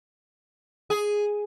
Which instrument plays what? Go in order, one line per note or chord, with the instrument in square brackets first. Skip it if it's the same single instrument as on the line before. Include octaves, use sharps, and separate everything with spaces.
[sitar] G#4